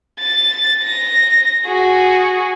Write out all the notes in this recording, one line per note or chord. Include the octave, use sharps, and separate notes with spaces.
A6
A#6
F#4 G#4